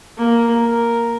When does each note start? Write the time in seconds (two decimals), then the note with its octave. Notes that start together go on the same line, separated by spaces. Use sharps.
0.18 A#3
0.64 A#4